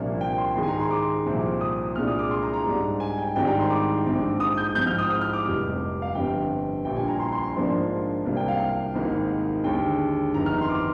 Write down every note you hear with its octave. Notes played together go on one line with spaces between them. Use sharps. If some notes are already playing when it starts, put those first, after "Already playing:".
Already playing: C2 A#2 F3 A#3 D4
G5
C6
G#2 D#3 G#3 C6
G#5
A#5
C6
D6
C2 A#2 F3 C4
D#6
C2 A#2 G#3 D4 F6
D#6
D6
C6
A#5
A#5
G#2 G3 D4
G#5
G5
G#1 G#2 D#3 G3 D4 G5
A#5
C6
D6
A#1 G#2 F3 C4
D#6
G6
G#2 F3 C4 G6
F6
D#6
D#6
F6
D6
F1 F2 C3 G3
F5
G1 F2 D3 G3 G5
A#1 A#2 G3 G5
G#5
A#5
C6
C6
C6
A#1 G#2 F3 A#3 D4
C2 C3 G3 A#3 D4
G5
F5
F5
G#1 G#2 D#3 A#3
D#2 D3 G#3 G5
G1 F2 D#3 A#5
F6
C6
D6